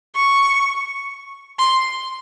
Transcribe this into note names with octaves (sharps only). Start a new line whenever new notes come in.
C#6
C6